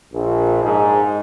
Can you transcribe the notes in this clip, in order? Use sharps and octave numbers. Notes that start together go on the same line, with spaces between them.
A#1
G#2